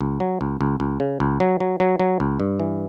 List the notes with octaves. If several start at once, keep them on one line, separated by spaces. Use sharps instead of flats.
C#2
F#3
C#2
C#2
C#2
C#3
C#2
F#3
F#3
F#3
F#3
C#2
G2
E3